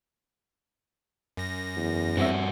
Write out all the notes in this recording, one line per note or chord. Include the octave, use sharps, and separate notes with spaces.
F#2 A#6
E2
G2 C4 F#4 E5